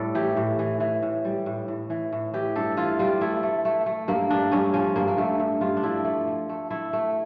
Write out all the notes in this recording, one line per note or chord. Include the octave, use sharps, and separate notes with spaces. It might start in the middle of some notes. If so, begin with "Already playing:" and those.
Already playing: A2 G3 A3 A4
E3 G4
A2
E3
E3
A2
G3
A2
A2
E3
A2
E3 G4
G2 A4
E3 F4
G3 F4
A3 E4
A3
A3
A3
G2 A#3
G2 D4
G2 C#4
F3 C#4
G2 A#3
A#3
G2 A3
G2
G2 F4
D4
F3 E4
A3
F3
A3
A3 E4
A3